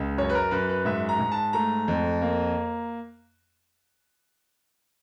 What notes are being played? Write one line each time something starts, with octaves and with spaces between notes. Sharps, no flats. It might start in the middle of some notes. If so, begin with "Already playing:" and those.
Already playing: C#2
F#2 C#5
B4
A#4
F#2 B4
B4
G#2 E5
A#5
G#2
A5
A3 A#5
F2
A#3